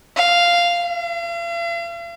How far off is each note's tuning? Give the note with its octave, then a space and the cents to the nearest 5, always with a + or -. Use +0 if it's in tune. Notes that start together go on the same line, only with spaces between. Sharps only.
F5 -5
F5 -45